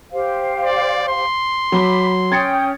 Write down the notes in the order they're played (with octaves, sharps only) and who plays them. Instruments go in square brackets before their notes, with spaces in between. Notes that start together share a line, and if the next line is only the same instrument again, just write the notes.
[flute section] G4 C5 F5
[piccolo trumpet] D5
C6
[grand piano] F#3 G7 [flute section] B5 D6
[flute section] C#4 G5 D#6 [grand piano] G#6 A6 C#7